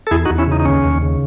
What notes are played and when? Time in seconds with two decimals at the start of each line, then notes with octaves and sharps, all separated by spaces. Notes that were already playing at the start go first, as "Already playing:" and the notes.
0.07 A4
0.11 E2 E4 G#4
0.25 D#4 F#4
0.30 E2
0.38 C#4 E4
0.47 C#3 D#4
0.60 D#4
0.65 D#2 C#4
0.84 D#2
1.02 C#3